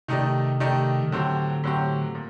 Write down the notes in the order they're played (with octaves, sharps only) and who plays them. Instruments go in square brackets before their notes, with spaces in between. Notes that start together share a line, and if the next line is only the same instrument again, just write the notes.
[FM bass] C3 [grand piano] D#3 A3 D#4 G4 D5
[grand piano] D#3 A3 D#4 G4 D5
[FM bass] D#3
[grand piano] A2 F#3 C4 G4 [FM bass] D3
[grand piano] A2 F#3 C4 G4
A#2